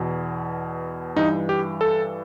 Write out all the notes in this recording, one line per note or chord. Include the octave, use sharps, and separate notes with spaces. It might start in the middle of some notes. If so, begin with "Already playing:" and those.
Already playing: E2 B2
G2 E3 D#4
G4
A4